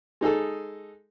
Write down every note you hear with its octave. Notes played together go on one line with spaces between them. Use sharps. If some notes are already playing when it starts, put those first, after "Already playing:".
G#3 D#4 G#4 A4